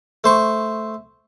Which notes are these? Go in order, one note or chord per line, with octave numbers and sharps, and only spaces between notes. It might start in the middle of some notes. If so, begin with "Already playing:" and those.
A3 C5 C#6